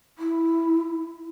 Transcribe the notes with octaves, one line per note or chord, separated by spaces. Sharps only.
E4